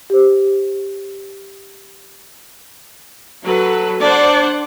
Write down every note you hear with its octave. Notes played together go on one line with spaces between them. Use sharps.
G4 C5
F#3 A4 B4
D4 C5 D5 F#5